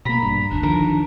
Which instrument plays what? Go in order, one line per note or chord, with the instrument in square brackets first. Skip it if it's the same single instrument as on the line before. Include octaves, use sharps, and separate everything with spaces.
[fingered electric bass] B2 A#3 [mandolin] A#5 B5
[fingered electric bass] A#1 G2
[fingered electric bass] F1 D2 [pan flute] D4
[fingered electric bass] D3 D#3 F3 [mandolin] A#4